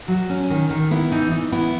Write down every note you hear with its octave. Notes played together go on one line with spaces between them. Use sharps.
F#3
C#4
D#3
D#3
B3 E4
E3 D#4
E3 D#4
B3 E4